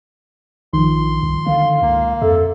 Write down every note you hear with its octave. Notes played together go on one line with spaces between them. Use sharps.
A#1 D#3 F3 C6
C2
D3 F5
C#2 A#3
F2 A4 E5